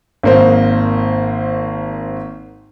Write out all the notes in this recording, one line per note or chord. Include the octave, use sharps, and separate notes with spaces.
G#1 A#3 C5